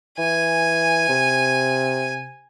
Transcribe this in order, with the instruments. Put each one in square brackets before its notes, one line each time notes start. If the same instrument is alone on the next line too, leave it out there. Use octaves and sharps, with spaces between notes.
[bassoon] E3 [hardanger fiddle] G#5
[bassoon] C3